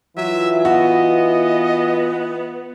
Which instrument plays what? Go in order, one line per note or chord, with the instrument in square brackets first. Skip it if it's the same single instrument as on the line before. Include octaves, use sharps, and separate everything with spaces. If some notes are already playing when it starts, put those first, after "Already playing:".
[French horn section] E3 F4 [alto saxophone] F#3 [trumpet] E5
[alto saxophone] B3 [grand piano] F#4 [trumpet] D#5